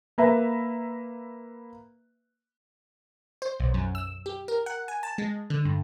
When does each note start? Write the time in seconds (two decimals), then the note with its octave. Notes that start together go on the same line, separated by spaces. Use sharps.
0.18 A#3 B4 E5 A#5
3.42 C5
3.60 B1
3.74 F#2
3.95 E6
4.26 G4
4.48 A#4
4.66 F#5
4.88 G#5
5.03 A5
5.18 G#3
5.50 D3
5.65 G2